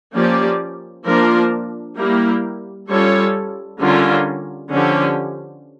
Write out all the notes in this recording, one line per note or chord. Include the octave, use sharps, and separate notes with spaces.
F3 A#3 C#4 G4 D5
F3 A#3 D4 F4 A#4
G3 A#3 E4 G4 A#4
G3 C#4 F4 A4 C#5
D3 G3 C#4 F4 A#4
D3 F3 C#4 G4